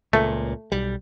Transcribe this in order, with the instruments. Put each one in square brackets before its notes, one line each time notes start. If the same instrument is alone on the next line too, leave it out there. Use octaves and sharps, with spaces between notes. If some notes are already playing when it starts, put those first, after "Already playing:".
[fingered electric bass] C#2 A#2 [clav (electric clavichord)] A3
[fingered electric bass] B1 G3